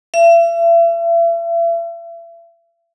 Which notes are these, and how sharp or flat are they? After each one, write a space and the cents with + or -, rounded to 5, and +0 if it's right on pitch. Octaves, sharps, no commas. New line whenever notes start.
E5 +40